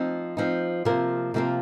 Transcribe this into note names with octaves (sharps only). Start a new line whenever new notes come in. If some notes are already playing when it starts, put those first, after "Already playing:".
Already playing: F3 C4 D#4
F3 C4 D#4
C3 F3 A#3 F4 A#4
C3 F3 A#3 F4 A#4